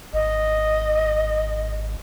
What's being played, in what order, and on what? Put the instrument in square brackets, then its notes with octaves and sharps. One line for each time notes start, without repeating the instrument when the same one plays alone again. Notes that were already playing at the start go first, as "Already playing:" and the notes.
[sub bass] G#1 [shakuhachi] D#5